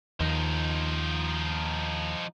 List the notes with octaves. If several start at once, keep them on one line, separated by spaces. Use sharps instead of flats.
D#2 F3 D#4